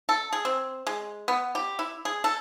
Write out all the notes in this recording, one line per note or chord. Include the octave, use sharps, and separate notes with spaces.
A4
G#4
C4
G#3
B3
G4
E4
G#4
A4